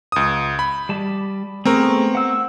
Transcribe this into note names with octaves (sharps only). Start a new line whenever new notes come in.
C#2 D#6
B5
G3 A5
A3 B3 C4 G#4 A#4
F#5 E6